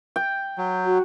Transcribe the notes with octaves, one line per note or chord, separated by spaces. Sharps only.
G5
F#3
F#4